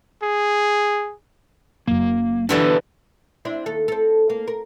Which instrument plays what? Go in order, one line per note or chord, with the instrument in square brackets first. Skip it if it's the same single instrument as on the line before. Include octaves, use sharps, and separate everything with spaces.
[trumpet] G#4
[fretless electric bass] F#1 F#2 [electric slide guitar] A#3
[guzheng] B2 D3 E3 [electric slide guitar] D4 G4 A4
[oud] C4 D4 E4
D#2 A4
C4 A4
A#3
A#4